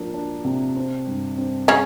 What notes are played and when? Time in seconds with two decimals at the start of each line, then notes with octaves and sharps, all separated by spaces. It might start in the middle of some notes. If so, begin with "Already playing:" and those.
Already playing: F3 A#3 D4
0.14 D4
0.45 C3
0.76 C4
1.06 G2
1.38 C4
1.68 C#3 C#4